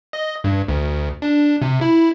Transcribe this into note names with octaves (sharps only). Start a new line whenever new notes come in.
D#5
G2
D2
D4
C3
E4